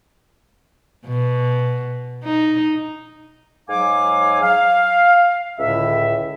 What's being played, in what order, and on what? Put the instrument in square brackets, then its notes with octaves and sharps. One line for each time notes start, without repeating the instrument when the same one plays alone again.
[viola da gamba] B2
D#4
[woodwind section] G#2 F#3 F5 G#5 D6
F5
C#2 A2 D3 E5